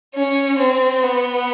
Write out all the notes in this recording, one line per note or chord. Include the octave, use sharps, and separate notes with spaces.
C#4
C4
B3